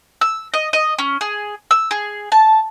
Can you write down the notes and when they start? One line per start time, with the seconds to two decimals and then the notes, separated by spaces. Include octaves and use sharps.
0.21 E6
0.54 D#5
0.73 D#5
0.98 C#4
1.21 G#4
1.71 E6
1.91 G#4
2.32 A5